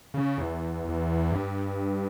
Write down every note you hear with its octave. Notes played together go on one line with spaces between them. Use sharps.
C#3
E2
E2
G2